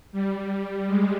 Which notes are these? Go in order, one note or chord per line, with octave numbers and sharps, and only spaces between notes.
G3
G#3